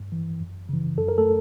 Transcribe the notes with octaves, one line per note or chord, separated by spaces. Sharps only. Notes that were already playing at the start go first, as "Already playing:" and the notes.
Already playing: G2
E3
F#2
C#3 E3
F#2 A4
A#4
A3 A4